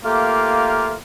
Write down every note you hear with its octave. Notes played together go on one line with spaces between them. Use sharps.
A3 A#3 F4 G4 A#4